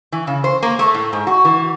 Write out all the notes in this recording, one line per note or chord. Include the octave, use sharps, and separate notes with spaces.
E3
C#3
C5
A#3
A3
A2
G#2
F#4
E3